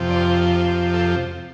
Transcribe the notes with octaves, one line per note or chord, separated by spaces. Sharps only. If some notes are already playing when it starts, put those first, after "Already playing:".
Already playing: F2 C3 F3
D5
C5
C5
A4